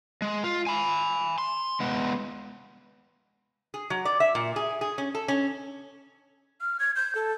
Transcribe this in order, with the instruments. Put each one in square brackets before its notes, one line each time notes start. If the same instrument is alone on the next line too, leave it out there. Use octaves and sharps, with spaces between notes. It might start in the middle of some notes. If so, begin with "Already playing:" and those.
[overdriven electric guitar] G#3
F4
G#5 B5
C6
G#3 B3
[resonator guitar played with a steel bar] G#4
F#3
D5
E5
A#2
G#4
G#4
C#4
A4
C#4
[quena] F6
G#6
G6
A4